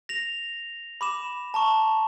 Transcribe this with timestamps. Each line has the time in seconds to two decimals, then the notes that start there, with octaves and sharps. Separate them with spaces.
0.09 A#6 F7
1.01 B5 D6 E7
1.54 A5 A#5 C#6